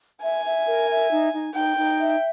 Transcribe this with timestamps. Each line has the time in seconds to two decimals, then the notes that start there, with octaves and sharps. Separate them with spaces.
0.23 E5 G#5
0.46 E5
0.66 A#4
0.89 E5
1.11 D#4
1.33 D#4
1.55 D#4 G5
1.77 D#4
1.99 E5